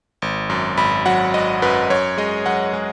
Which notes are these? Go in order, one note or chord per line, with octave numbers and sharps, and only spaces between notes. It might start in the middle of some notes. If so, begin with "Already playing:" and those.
G#1
F#2
G#1 B5
F#3 F#5
G#1 D#5
F#2 B4
F#2 C#5
G#3 D#5
F#2 F#5
G#3